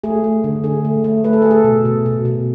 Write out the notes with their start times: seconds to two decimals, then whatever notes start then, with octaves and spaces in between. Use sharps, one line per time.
0.04 A3 G#4
0.24 A3
0.44 D3
0.64 D3 G#4
0.85 A3
1.04 A3
1.24 A3 B4
1.33 A4
1.42 A3 G#4
1.51 A4
1.64 B2
1.85 B2
2.06 B2
2.25 B2